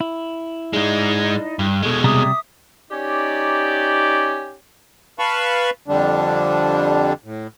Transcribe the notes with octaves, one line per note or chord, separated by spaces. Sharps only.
E4
G#2 G#3 D#4 D5 D#5
G2
B2 G#3 G#4 A4 C#6
C3 G3 E5 A#5 D6 D#6
C#4 D#4 G4 D5
B4 F5 A5 B5 C#6
F2 D3 G3 D4
A2